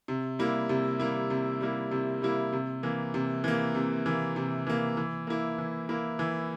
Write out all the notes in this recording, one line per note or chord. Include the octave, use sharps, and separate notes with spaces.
C3
G3 A#3 E4
C3
G3 A#3 E4
C3
G3 A#3 E4
C3
G3 A#3 E4
C3
E3 A#3
C3
E3 A#3
C3
E3 A#3
C3
E3 A#3
E3
A#3 E4
E3
A#3 E4
E3